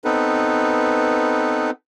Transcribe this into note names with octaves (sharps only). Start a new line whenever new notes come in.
B3 C4 D#4 A4 B4